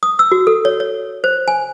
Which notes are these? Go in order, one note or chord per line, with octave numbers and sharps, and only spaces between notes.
D#6
E6
F#4
A4
C#5
C#5
C5
G#5